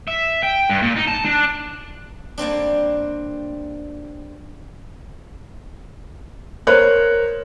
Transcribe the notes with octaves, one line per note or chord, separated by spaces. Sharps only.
E5
G5
G2
A#2
D#4
A5
D4
G3 A#3 C4 D4
A#4 C5 C#5 F#6